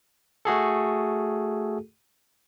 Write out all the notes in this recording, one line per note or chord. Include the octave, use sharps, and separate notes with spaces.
A3 F#4 G#4 A4